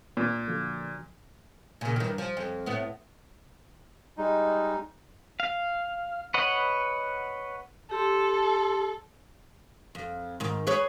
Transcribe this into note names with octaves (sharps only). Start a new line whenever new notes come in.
A#2
D3 F3 F#4
A#2 C#3
G2 D#3
F3
F2
A2 B3
G3 G#3 D#4
F5
B4 C#5 D#5 F#5
G4 A4 C6
F2
G#2 D#3
G#4 B4 C#5